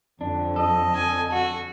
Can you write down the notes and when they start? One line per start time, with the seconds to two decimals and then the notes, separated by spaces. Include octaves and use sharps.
0.21 F2 D3 D4
0.56 A4 D#5
0.95 G#5
1.32 F#4